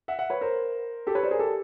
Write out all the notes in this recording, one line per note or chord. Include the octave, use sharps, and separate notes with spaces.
E5 F#5
E5 F#5
B4 C#5
A#4 C5
G4 A4
B4 C#5
C5 D5
G#4 A#4
G4 A4